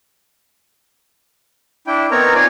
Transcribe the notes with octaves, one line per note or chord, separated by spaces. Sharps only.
D4 E4 G5
B3 C4 D#4 A#4 C#5 A#5
F4 C#5 D5 G#5 A#5